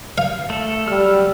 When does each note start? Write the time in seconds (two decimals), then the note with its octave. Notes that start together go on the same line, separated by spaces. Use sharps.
0.18 F5
0.50 A3 A4
0.88 F#3 G3 E6 F6